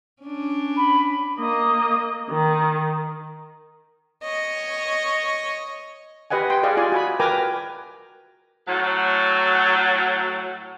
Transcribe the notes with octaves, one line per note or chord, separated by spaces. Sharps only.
C#4 D4
B5
A#3 D#5
D#3
C#5 D#5
G4 B4 D#5 F#5 G#5
G5 C6
G4 G#4 D5 D#5 F5
F4 D5 G#5
F#4 G#5 B5
A#4 B4 G5 G#5 A#5 D6
A2 F#3